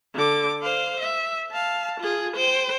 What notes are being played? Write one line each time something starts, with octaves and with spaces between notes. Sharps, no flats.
D3 D6
C5 F5
E5
F5 A5
F4 G#4
C5 G5